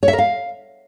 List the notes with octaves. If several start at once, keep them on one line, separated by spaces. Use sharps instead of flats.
C#5
E5
A#4
F5